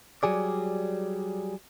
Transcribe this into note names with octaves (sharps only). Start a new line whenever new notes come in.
F#3 G3 G#4 D5